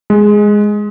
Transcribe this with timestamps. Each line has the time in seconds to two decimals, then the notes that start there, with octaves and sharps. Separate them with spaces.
0.10 G#3